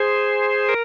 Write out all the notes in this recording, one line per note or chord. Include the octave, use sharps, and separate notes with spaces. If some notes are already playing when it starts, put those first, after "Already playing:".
Already playing: G#4 C5
A#4